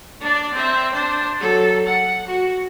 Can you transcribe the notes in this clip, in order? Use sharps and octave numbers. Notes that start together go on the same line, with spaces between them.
D4 D5
C4 E5
D4 C5
F#3 A4
F#5
F#4